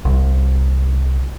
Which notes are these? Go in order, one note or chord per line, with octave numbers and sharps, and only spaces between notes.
C2